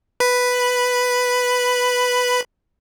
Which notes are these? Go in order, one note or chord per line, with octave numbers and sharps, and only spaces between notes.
B4 B5